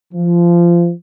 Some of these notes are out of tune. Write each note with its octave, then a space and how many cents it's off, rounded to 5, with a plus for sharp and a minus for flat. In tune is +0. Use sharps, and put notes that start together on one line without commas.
F3 -20